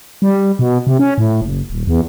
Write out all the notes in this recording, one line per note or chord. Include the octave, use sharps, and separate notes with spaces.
G3
B2
C3
C#4
A2
F#1
D#1
E2